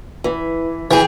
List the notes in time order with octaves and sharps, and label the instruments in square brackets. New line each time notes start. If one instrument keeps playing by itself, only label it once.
[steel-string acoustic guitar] E3
[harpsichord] E3 [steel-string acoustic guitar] G4 G#4